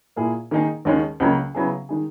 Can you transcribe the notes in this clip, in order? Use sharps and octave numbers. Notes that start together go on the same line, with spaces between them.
A#2 A#3 E4 G#4
D#3 A#3 D#4 G#4
D#2 D#3 G#3 C#4
C#2 C#3 F#3 A#3
C#3 F#3 B3 E4 G#4
D#3 G#3 D#4 G#4